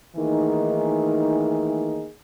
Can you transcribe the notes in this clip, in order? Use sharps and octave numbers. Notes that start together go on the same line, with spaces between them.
D#3 E3 A3 A#3 D#4 G#4